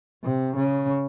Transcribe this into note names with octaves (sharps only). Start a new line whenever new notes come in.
C3
C#3